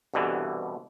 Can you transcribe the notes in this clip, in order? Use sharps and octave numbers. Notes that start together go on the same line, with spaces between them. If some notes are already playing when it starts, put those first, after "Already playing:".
C2 G2 B2 D3 E3